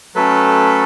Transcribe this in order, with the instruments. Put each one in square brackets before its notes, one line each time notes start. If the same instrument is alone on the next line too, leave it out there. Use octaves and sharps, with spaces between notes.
[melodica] F#3 A3 C#4 A4 B4